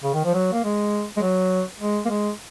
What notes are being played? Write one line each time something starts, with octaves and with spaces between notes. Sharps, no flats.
C#3
D#3
F3
F#3
A#3
G#3
G#3
F#3
G#3
A#3
G#3